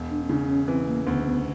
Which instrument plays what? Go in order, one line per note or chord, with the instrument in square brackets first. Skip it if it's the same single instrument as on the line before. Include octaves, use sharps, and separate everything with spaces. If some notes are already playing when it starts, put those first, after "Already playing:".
Already playing: [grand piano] E1
[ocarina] D4
C#4
[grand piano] C#3 [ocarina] D4
[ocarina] D4
C#4
[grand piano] E3 [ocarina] C4
[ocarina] A#3
[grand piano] D2 [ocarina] B3
[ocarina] B3